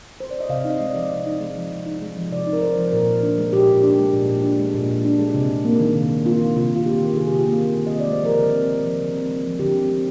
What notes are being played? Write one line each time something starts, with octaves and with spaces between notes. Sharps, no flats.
C5
D5
D#5
C3 F5
D#4
D#5
G#3
D5
F3
C3
D#4
G#3
F3
C3
D#4
G#3
F3
C3 D5
D#4
A#4
G#3 C5
F3
A#2 A#4
A#2
D4
G#3
A#2 G4
A#2
D4
G#3
A#2
A#2
D4
G#3
A#2
A#2
D4
G#3
C3
C3
A#3
D#3
C3
C3
A#3 F4
D#3
C3 F4
C3 F4
A#3 G4
D#3
C3 G#4
C3 G4
F4
A#3 G4
D#3
D3
D#5
C4
D5
G#3 C5
F3 A#4
D3 G#4
C4
G#3
F3
D3
C4
G#3
F3
D3 G4
C4
G#3